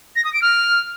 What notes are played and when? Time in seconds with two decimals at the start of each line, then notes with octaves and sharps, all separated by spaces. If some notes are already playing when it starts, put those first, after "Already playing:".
0.16 A#6
0.24 D#6
0.33 D7
0.42 F6